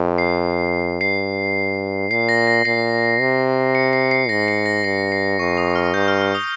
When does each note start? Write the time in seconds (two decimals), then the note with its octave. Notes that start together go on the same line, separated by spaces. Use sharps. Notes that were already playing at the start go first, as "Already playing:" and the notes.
Already playing: F2
0.18 C7
1.01 G2 C7
2.11 A#2 C7
2.29 A#6
2.47 A#6
2.65 A#2 C7
3.20 C3
3.75 C#7
3.93 C7
4.11 C7
4.29 G#2 A#6
4.48 C7
4.66 A#6
4.84 G2 C7
5.12 C7
5.39 F2 C#6
5.57 D#6
5.76 F6
5.94 G2 G6
6.08 F6
6.22 F6
6.35 D#6